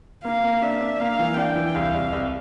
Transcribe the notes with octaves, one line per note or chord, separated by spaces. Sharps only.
A#3 F5
A#3
D4 E5
D4
A#3 F5
E3
D4 G5
E3
C2 F5
C2
C2